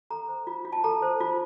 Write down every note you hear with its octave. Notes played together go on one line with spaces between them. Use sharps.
A4 A#5
C5
F4
F4
A5
A4 A#5
C5
F4